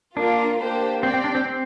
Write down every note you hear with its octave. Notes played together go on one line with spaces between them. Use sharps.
A#3 D4 F4 A#4
A#3 D4 G4 C5
C4 G4 D5 G5
C4
D4
C4
C4